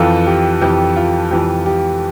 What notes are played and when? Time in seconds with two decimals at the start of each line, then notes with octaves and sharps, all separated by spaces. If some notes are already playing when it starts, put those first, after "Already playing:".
Already playing: F2 E3 F4 A4
0.27 G4
0.61 F2 E3 G4
0.96 F4
1.31 F2 E3 G4
1.66 G4